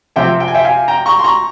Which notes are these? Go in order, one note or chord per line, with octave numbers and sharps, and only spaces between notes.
C3 F3 C4 E5 G5
G5
G#5
E5 G5
F5 G#5
G5 A#5
A#5 C#6
C6
A#5 C#6